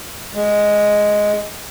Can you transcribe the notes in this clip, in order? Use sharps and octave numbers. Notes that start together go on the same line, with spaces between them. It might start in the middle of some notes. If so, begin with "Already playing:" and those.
G#3